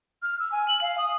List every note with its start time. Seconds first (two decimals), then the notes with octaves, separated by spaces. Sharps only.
0.22 F6
0.39 E6
0.52 G#5
0.68 F#7
0.82 F5
0.98 D#6